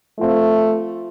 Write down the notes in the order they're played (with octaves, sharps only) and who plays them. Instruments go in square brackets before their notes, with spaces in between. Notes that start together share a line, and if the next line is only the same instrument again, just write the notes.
[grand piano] F3 C4 F4 [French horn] A3